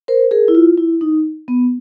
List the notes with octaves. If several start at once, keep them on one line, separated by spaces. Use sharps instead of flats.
A#4 C5
G#4 A#4
E4
F4
E4
D#4
B3